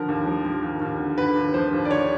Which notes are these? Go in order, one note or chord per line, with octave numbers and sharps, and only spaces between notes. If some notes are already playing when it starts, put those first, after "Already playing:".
Already playing: D3 F3 A#4
D#2
F3
F3
D#2
D#2
D3
D3 B4
D#2
F3 C5
D#2
D5
D3 C#5